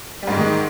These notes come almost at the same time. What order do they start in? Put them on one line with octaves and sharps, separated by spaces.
G3 G#2 G#3 D#3